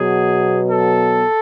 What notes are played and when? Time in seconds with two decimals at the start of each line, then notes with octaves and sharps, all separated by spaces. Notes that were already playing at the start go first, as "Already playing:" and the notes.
Already playing: B2 F#3 B3 G#4
0.69 A4